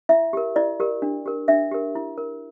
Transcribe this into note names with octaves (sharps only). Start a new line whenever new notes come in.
E4 E5
G4 A#4
E4 D5
G4 A#4
D4
G4 A#4
D4 E5
G4 A#4
E4
A#4